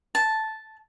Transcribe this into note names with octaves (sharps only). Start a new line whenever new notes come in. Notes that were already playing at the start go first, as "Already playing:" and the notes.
A5